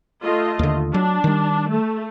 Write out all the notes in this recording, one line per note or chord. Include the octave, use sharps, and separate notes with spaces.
A3 F4 D#5
D#2 D3
F#3 D4
D#3 G3
A3